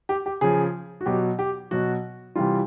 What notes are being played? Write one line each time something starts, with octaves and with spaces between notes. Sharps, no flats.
G4
G4
C#3 F3 G#4
F#4
B2 F#3 G4
G4
B2 F#3 F#4
C3 E3 G3 F4